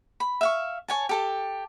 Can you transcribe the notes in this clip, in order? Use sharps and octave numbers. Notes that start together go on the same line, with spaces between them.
B5
E5 F5 C#6
C#5 G#5 A5
G4 A4 A5